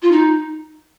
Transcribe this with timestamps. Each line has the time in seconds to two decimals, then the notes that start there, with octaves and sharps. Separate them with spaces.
0.02 F4
0.12 D#4